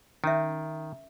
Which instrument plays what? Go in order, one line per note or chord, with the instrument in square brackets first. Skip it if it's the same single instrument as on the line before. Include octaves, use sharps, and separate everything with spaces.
[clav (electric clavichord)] D#3 [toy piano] C#4 E5